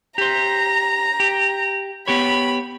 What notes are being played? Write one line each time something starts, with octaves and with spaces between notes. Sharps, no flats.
G4 C5 A#5
G4
B3 G4 C#5 B5